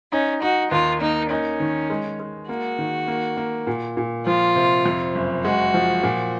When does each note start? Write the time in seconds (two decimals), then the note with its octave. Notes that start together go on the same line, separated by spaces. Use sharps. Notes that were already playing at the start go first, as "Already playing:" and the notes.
0.12 C#4 D#4
0.42 D#4 F#4
0.71 D#2 F4
1.01 A#3 D#4
1.30 C#4 D#4
1.60 D#3
1.90 G#3
2.19 G#3
2.49 A#3 F#4
2.79 D#3
3.07 A#3
3.37 A#3
3.67 A#2
3.97 A#2
4.27 F3 F4
4.56 C3
4.86 F2
5.15 F#1
5.45 G#3 F#4
5.74 F3
6.03 A#2